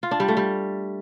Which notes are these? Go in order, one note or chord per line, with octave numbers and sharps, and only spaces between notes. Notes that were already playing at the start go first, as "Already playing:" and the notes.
F4
D4
G3
A3
G3